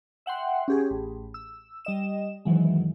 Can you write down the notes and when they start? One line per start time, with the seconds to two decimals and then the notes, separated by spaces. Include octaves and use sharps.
0.26 E5 F#5 G5 C6
0.68 C#4 G4 G#4
0.90 A1
1.34 E6
1.85 G3 D#5 E7
2.45 F#2 D#3 E3 F#3 G#3